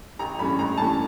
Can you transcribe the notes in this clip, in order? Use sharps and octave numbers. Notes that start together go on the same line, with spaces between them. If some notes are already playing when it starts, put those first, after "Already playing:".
A1 A#5
G2 E3 A3 C#4 B5
A1 A#5
G2 E3 A3 C#4 A5